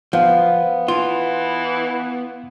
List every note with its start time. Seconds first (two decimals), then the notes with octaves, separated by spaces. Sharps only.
0.13 F3 B3 F5 F#5
0.88 E3 F4